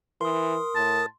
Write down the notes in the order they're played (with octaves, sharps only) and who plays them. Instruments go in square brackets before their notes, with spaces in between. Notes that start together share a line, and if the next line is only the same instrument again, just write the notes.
[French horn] E3 [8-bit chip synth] A#4 D#6 [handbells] C6
[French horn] A2 [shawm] A5